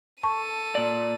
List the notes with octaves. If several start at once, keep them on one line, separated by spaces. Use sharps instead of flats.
A4 A5 C#6 D#7
A#2 D5